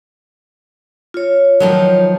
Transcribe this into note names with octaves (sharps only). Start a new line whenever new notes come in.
F4 C#5
D#3 F3 F#3